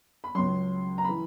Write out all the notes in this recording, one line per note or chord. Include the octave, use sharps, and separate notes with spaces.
B5
C#2 C#3 F#3 C6
A#5
E3 B5